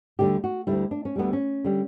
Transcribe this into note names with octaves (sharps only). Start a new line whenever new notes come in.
D2 D3 G3 G4
F#4
D2 D3 G3 E4
D4
C#4
D2 D3 G3 B3
C#4
D3 G3